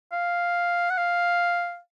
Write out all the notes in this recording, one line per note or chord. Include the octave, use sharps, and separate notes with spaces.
F5
F#5
F5